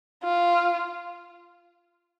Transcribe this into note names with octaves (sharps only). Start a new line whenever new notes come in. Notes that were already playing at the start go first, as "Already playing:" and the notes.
F4